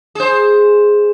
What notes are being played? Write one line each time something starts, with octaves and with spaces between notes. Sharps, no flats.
G#4 C5